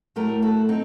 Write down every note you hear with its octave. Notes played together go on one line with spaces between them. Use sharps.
A2 F#3 A3 G4 A#4
F#4 A4
C4 D#4